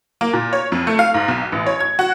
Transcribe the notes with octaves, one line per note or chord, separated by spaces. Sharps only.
A#3
A#2
C#5
F2
A3
F5
G#2
B1
A1
C#5
G#6
F#4